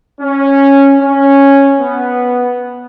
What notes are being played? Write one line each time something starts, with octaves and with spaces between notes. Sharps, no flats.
C#4
C#4
B3